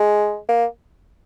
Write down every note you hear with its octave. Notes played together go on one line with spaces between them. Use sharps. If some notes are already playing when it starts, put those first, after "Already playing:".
Already playing: G#3
A#3